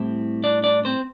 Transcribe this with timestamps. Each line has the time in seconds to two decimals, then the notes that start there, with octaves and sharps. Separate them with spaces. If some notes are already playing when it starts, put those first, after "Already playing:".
Already playing: A2 G3 C4 E4
0.44 D4 D5
0.64 D4 D5
0.85 C4 C5